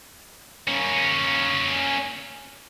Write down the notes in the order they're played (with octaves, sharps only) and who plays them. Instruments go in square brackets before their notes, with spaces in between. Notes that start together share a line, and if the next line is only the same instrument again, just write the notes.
[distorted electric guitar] A#3 C#4